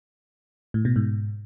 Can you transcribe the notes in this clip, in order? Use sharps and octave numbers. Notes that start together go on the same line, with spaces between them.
A2
B2
G#2